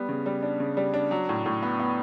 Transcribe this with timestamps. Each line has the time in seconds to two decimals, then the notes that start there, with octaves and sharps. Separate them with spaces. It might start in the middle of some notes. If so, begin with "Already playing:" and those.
Already playing: G3 B3
0.09 C#3
0.26 G3
0.43 D4
0.60 C#3
0.77 G3
0.94 D4
1.11 F#3
1.29 A2
1.46 A2
1.63 B3
1.80 B3